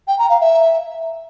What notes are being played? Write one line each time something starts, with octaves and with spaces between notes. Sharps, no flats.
G5
A#5
F5
E5